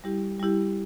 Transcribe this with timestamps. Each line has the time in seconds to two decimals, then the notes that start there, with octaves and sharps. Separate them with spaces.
0.04 G3 E4 G4
0.39 G3 E4 G4